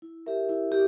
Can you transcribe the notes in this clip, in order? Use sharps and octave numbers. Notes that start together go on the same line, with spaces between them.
E4
G4 A#4 E5
E4
G4